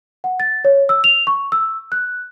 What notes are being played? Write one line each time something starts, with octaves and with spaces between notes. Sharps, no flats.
F#5
A6
C#5
E6
F7
C#6
E6
F#6